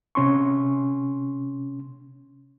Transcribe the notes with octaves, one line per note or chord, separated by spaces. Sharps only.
C3 C#4 C6 C#6